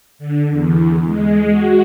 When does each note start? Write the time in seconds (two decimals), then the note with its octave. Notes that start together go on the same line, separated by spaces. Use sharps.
0.19 D3
0.50 E2
1.05 G#3
1.50 F#4